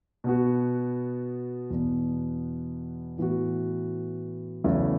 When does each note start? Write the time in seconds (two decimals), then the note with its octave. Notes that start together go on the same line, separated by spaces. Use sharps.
0.24 B2 B3 F#4
1.70 E2 B2 B3
3.18 A2 E3 B3 F#4
4.64 E2 C#3 F#3 A3 E4